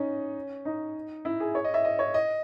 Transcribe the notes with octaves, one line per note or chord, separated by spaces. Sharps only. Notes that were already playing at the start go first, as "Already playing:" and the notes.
Already playing: C#4 D#4
D#4
E4
G#4
C#5
D#5
E5
D#5
C#5
D#5